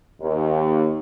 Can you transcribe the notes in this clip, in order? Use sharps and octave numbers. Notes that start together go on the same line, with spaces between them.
D#2